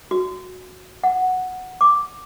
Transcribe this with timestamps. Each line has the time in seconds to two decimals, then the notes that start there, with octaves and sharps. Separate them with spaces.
0.11 F#4
1.04 F#5
1.81 D6